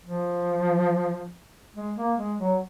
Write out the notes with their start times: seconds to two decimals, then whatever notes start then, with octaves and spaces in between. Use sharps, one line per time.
0.06 F3
1.75 G#3
1.97 A#3
2.18 G#3
2.39 F#3